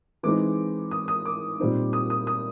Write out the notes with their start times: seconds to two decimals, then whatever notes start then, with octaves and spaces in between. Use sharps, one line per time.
0.23 E3 G#3 C4 D#4 D6
0.91 D#6
1.08 D#6
1.25 D6
1.59 A#2 G3 C4 D#4
1.93 D#6
2.10 D#6
2.27 D#6